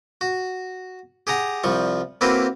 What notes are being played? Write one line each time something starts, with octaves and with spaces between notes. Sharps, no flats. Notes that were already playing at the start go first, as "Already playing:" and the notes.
F#4
G4 G#4 F#5 A#5
C2 F3 G3 C#6
A#3 C4 E4 F#4 G4 B4